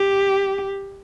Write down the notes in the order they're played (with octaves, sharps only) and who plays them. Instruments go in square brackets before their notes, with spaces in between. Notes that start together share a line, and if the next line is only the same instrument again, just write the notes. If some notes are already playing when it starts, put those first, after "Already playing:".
Already playing: [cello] G4